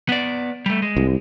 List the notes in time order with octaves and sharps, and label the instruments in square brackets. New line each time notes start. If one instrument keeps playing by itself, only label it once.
[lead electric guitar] B3 D5
G3 A3
G#3
[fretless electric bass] C2